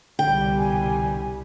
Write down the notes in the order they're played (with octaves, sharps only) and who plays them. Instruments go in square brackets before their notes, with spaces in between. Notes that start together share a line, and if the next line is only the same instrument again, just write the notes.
[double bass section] C2 B2 G3 [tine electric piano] D3 [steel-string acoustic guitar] G5
[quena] G#5